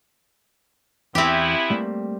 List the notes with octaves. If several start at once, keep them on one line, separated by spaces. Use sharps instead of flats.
E2 E3 B3 C4 E4 G4 E5
G3 A3 A#3